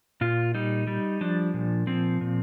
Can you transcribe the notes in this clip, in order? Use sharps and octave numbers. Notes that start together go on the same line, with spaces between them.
A#2 F4
G3 D#4
G3
F3 D4
A#2
F3 C4
A#2